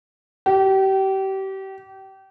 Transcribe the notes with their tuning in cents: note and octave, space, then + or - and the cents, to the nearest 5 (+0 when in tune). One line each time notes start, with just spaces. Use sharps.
G4 -30